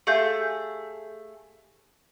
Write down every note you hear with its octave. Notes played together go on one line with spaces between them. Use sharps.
A3 G4 G#4 E5 F5 G6